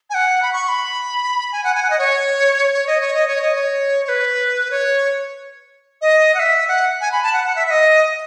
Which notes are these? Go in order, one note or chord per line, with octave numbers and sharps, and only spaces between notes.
G#5
F#5
B5
C#6
C#6
B5
G#5
F#5
G#5
F#5
D#5
C#5
C#5
D#5
C#5
D#5
C#5
D#5
C#5
C#5
B4
C#5
D#5
F#5
E5
F#5
G#5
B5
A5
F#5
F#5
E5
E5
D#5